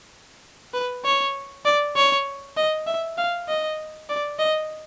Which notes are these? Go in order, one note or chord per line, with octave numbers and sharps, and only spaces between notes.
B4
C#5
D5
C#5
D#5
E5
F5
D#5
D5
D#5